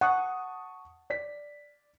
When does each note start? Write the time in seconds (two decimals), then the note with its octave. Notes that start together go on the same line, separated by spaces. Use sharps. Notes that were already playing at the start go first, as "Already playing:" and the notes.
0.01 F#5 A5 C#6 D#6
1.10 D5 B6